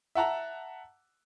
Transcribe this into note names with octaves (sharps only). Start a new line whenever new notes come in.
E5 F#5 A5 A#5